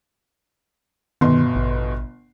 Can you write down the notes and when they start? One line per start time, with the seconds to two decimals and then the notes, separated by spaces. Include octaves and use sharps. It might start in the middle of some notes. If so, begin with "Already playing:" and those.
1.21 G1 B2 D#3 C6
1.56 A1